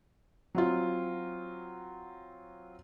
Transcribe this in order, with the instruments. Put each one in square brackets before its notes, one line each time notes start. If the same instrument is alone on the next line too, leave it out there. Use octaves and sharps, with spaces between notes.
[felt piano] F#3 C4 F4